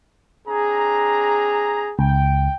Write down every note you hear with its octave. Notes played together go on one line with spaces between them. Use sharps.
C4 D4 G#4 A#5
C#2 G5